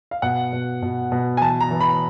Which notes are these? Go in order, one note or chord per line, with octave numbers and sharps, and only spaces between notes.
F5
B2 F#5
B2
B2
B2
G#5
E3 A5
A#5
E3
B5